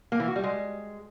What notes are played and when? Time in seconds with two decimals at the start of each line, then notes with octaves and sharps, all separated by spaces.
0.12 A#3
0.20 E3
0.28 F#4
0.36 G3
0.44 G#3